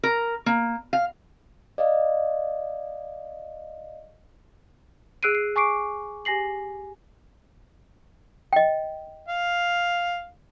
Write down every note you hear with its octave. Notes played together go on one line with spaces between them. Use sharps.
A#4
A#3
F5
D5 D#5 F5
G#4 E6 F#6 C7 D7 D#7
C7
G#5 C#6 D6 C7 D7
G4 G#5 A#6 C7 F#7
D#5 G5
F5